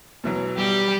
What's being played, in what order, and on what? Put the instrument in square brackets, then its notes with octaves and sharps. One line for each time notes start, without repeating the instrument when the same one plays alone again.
[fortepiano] B2 E3 F#3
[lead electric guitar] G3 [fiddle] G4